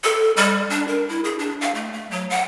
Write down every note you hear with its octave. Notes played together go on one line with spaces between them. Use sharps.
A4
G3
D4
A#4
E4
G#4
D4
F5
A3
A3
F#3
F#5